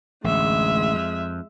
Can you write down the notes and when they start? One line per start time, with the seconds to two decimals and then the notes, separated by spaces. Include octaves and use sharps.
0.24 A1 D2 G#3 E5
0.94 F2